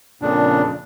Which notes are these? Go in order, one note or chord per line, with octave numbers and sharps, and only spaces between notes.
F2 A#2 C#3 D4